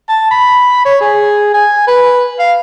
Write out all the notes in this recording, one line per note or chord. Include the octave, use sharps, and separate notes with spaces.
A5
B5
C#5
G#4
G#5
B4
F5